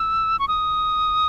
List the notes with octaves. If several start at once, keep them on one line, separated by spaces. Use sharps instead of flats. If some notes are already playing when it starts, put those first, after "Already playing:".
Already playing: E6
C#6
D#6